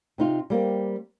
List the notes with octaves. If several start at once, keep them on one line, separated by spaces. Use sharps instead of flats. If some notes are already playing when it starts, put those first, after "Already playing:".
C3 D#4 F4
G3 A#3 C4